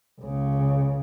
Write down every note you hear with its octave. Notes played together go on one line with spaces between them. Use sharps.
C#2 C#3